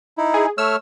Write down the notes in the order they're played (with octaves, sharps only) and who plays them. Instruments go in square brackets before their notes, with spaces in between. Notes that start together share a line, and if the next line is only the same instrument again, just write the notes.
[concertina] D#4 E4
[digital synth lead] G#4
[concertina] A3 C#5 F6 [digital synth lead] E6